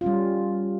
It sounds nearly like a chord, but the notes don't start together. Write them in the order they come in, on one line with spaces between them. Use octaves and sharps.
F4 C#4 G3